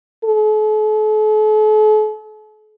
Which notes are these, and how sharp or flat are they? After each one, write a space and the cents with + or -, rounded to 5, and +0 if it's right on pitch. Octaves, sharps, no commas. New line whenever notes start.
A4 -45